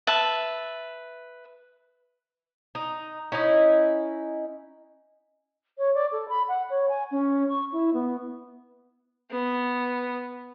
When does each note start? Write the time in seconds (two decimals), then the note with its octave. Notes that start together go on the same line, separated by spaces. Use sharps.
0.07 B4 E5 A5
2.75 D#4
3.32 C#4 D#4 E4 D#5
5.78 C#5
5.94 D5
6.12 A4
6.29 B5
6.48 F#5
6.70 C#5
6.89 G#5
7.11 C#4
7.49 C#6
7.72 E4
7.94 B3
9.31 B3